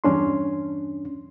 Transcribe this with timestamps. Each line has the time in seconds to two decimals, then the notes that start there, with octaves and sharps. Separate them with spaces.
0.04 E2 G2 C#4 D4 C6